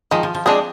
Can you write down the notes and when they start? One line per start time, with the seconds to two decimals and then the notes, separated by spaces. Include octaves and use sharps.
0.11 D#3 F3 G#3
0.23 F3
0.35 F3
0.46 G#3 C4 D4 G#4